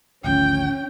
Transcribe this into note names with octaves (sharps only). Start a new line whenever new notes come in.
G#1 D2 F3 C#4 G5